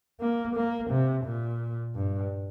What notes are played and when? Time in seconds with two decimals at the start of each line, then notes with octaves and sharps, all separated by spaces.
0.21 A#3
0.56 A#3
0.91 C3
1.25 A#2
1.95 G2